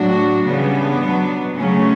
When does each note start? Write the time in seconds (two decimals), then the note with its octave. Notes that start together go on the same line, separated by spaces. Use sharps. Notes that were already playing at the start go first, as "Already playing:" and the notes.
Already playing: A2 F#3 D4 F#4
0.45 C#3 E3 G3 B3 D4
1.00 B2 F#3
1.56 C#3 F#3 A3 C#4